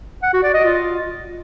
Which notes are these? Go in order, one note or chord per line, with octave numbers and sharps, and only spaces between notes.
F#5
F#4
D5
D#5
F4